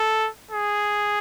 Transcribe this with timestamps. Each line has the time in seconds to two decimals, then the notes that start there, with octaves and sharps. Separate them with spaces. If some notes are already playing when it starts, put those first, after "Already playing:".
Already playing: A4
0.51 G#4